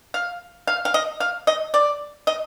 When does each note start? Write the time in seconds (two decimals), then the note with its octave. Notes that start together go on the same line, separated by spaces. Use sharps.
0.14 F5
0.67 F5
0.85 F5
0.94 D#5
1.20 F5
1.47 D#5
1.74 D5
2.27 D#5